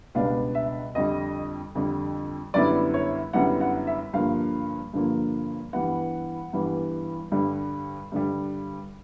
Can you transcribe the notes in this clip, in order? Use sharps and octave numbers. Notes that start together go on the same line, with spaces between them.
C#2 B2 G3 B3 D4 F5
E5
F2 D3 G3 D#5
F2 D3 G3
F#2 D3 G3 B3 E4 D5
C#5
F#2 D3 G3 B3 E4 F#5
F#5
E5
G2 D3 F3 A#3 F5
G2 D3 F3 A#3
G2 E3 G3 B3 F#5
G2 E3 G3 B3
G2 D3 G3
G2 D3 G3